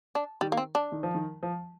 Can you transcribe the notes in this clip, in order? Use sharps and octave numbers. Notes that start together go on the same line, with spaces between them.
D4
D#3 G3
A#3
C4
D4
D#3
F3
D#3
F3